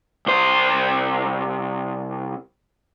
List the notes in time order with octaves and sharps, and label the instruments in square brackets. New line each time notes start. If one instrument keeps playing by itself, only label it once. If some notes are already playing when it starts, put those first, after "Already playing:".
[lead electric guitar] C2 C5